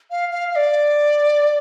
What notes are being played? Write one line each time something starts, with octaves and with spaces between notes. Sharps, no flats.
F5
F5
F5
D5